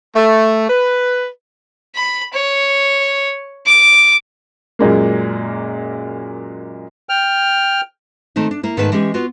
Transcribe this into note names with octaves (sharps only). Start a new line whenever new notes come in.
A3
B4
B5
C#5
D6
F#2 A#2 G#3 A#3
G5 F6
D#3 A3 C4 D#4
D4
A#3 E4
G#2 D#3 A3 A#4 B4 A5
E3 G#3 C#4 G4
B3 F4 F#4